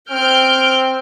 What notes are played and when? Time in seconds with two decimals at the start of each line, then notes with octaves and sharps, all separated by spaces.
0.11 C4 F6 G6 D7